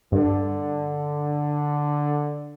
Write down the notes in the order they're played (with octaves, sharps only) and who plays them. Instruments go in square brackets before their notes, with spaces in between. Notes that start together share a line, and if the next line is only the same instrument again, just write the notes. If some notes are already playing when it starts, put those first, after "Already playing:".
[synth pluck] G2 [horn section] D3